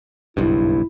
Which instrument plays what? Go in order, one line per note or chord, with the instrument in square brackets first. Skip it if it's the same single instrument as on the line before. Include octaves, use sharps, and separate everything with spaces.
[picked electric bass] F#1 B1 G2 [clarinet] E4